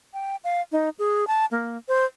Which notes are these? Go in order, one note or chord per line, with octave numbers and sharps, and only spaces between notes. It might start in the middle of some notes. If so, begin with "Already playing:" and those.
G5
F5
D#4
G#4
A5
A#3
C5